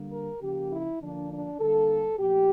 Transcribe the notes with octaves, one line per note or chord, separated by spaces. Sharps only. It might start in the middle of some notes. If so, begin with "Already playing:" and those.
Already playing: D3 G3 A#3
A#4
C#3 F3 A#3 G4
E4
D3 F3 A#3 D4
D4
D3 G3 A#3 A4
A#2 F3 A3 G4